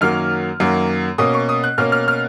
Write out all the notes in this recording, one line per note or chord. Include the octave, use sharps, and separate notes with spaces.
F#2 D#3 F#3 A#3 F6
F#2 D#3 F#3 A#3
B2 A#3 C#4 D#6
C#6
D#6
F#6
B2 A#3 C#4 F6
F6
F6